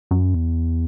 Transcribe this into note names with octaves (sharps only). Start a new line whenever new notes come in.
F#2
E2